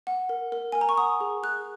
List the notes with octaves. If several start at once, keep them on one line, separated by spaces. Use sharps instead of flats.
F#5
A#4
A#4
A#4 G#5
A#5
C#6
F#5 D#6
G#4
G#4 F#6